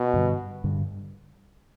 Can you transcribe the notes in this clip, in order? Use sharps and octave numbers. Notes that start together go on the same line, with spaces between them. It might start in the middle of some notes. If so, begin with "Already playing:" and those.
Already playing: B2
G2 D3 G3
G2 D3 G3